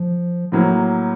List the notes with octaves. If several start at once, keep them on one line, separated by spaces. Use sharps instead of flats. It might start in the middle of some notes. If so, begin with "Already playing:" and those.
Already playing: F3
A2 F3 F#3 A#3